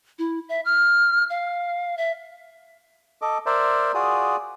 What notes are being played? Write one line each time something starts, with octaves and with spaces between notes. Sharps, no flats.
E4
E5
F6
F5
E5
A4 D#5 D6
A#4 C5 D5 E5
F4 F#4 G#4 D5 D#6